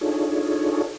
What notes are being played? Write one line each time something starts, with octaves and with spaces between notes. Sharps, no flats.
D4 D#4 F4 G#4 A4 C#5